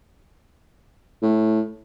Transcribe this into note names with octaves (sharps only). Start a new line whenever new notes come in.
A2